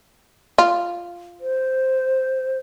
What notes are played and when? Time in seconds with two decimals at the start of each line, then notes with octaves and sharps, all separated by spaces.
0.58 F4
1.41 C5